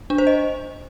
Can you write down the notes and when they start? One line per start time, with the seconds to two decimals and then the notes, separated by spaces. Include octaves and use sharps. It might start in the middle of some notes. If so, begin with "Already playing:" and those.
0.10 D4
0.18 C5
0.27 D#5